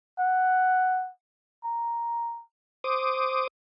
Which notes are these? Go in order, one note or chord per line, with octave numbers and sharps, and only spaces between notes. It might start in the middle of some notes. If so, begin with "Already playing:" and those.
F#5
A#5
C5 D6 D#6